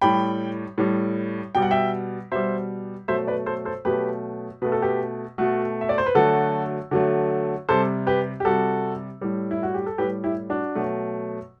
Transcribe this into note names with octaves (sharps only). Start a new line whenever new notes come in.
A2 G3 G5 B5
A2 G3
B2 G3 G5
F#5
E5 G5
B2 G3 C5 E5
B2 F#3 A3 C5 E5
B4 D5
A4 C5
A4 C5
B2 F#3 A3 G4 B4
B2 A3 B4
A4
G4 B4
B2 A3 F#4 A4
E5
D5
C5
B4
D3 F#3 A3 F#4 A4
D3 F#3 A3
C3 G3 A4 C5
G4 B4
G4
C3 G3 F#4 A4
A2 G3
E4
F#4
G4
A4
A2 G3 G4 B4
E4 G4
D4 F#4
B2 F#3 A3